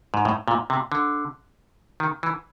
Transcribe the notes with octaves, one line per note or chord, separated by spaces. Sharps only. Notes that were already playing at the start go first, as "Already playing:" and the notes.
G#2
A2
A#2
C3
D3
D#3
E3